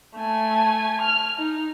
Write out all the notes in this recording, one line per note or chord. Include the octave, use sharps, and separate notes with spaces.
A3 G#5
F6
D#4